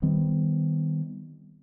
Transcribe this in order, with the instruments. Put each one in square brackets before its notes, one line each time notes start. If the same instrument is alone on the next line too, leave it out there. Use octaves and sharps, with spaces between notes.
[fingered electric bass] D#3 G3 B3 C4